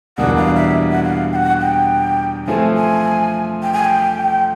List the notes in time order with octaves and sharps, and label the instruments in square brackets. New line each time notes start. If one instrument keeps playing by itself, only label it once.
[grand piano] E2 B2 G3 A#3 D4 [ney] F#5
[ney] F5
E5
F#5
F5
G5
F#5
G5
[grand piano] F3 A3 C4 [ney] G#5
[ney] G#5
G5
G#5
G5
G5